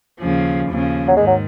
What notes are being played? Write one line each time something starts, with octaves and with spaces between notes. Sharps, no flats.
D#2 C#3 F3
D#2 C#3 F3
F#3
G#2 D#3 G#3
F#3